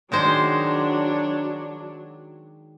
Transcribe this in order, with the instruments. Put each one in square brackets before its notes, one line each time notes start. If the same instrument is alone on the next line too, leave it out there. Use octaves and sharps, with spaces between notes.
[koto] D#3 G#3 C5 [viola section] F#3 D4